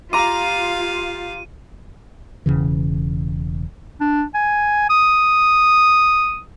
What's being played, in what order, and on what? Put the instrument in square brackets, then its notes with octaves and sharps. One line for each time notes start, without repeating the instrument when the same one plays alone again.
[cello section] F4 [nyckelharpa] G4 F5 [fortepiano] A#5 D6 [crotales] D#7
[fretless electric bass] E1 D#2 C#3 E3
[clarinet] D4
G#5
D#6